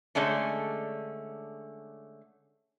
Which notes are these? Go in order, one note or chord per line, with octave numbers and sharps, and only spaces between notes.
D3 G#3 A3 C#4